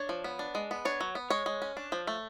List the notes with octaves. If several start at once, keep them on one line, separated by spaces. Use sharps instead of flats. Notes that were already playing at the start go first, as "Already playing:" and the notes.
Already playing: D4 C#5
F3
B3
D4
G#3
B3
D4 C#5
F#3
B3
G#3 C#5
G#3
C#4
D4
F3
A3